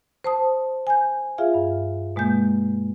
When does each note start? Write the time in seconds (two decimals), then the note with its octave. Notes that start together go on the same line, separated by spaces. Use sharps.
0.24 C5 A5 D#6
0.87 G#5 G6
1.38 F4 G#4 E5 F5
1.54 G2
2.16 B2 G#3 A#3 G6